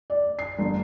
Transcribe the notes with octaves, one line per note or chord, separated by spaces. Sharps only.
D5
C7
G1